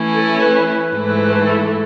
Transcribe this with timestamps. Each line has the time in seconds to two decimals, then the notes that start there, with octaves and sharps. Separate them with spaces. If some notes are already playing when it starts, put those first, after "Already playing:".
Already playing: E3 A3 C#4 E4
0.15 A4
0.42 B4
0.94 G#2 E3 A3 E4
1.34 B4
1.45 A4